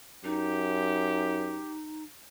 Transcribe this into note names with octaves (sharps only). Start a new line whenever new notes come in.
F#2 D#4 G4